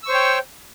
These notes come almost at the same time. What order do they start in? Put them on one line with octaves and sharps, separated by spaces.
E6 C#6 C5 C#5 G5